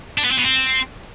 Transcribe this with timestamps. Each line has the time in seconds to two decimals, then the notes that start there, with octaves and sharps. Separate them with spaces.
0.18 D4
0.24 B3
0.31 C4
0.38 B2
0.44 C4